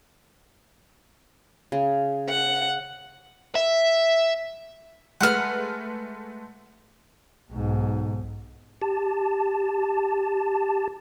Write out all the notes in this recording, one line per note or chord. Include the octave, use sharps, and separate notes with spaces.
C#3
F#5
E5
G#3 A3 B4 F#5 F6
B1 G#2
G4 A5